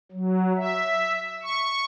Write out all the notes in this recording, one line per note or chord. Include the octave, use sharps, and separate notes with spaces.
F#3
E5
C#6